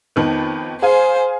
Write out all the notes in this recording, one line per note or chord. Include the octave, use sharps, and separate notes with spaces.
F2 D#3 B3
G#4 C5 F5 G#5